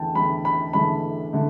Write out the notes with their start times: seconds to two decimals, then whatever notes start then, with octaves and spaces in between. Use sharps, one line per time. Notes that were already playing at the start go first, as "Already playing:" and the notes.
Already playing: E2 D3 A3 G5 A5
0.15 E2 D3 A3 B5
0.45 B5
0.73 E2 D3 A3 B5
1.33 D3 A3